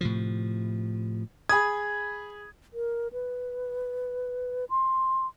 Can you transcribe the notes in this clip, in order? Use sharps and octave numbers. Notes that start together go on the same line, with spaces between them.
A2 C3 F3
G#4 B5 D#6 G#6
A#4
B4
C6